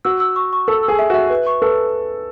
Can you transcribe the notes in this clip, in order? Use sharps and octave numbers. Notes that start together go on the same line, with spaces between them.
F#4 E6
E6
C#6
C#6
A4 E6
E6
G#4
E5
F#4 E5
B4
C#6
A4 B4